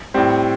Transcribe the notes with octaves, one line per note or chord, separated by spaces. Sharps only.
A2 G3 C4